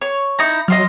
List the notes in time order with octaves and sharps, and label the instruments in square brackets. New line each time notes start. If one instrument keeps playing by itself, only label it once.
[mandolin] C#5
D#4 E4 A#5
[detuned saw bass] F#3 [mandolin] D#5 C6 F6